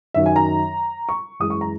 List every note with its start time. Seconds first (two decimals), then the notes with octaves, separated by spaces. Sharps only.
0.14 F#2 D#3 F#3 E5
0.26 G#5
0.36 A#5
1.09 C#6
1.40 F#2 E3 G#3 D#6
1.50 C#6
1.61 A#5